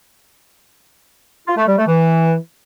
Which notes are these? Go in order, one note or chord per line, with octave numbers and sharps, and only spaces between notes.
F4
A3
G3
A3
E3